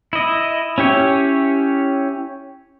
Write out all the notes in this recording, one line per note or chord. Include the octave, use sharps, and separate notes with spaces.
E4 D#5
C#4 E4 G4 C#5